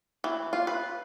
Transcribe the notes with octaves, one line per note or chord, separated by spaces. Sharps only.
E3
F4
B4